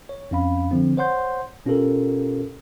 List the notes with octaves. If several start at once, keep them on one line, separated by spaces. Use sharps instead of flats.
C#5
F2 C#4 F5 B5
D3 F3 C4
C5 C#5 F#5 C6 G6
B2 C#4 F4 G4 A4 A#4